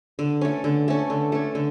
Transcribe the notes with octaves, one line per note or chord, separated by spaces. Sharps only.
D3
A3 C#4
D3
A3 C#4
D3
A3 C#4
D3